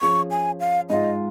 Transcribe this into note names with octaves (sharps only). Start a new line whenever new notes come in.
F3 C#4 G#4 C#6
G#5
F5
G#2 G#3 F4 D#5